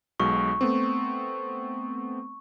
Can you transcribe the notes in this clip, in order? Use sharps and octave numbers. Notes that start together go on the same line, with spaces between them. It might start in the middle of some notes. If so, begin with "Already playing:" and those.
B1 B2 G#3 C#6
A3 B3 C4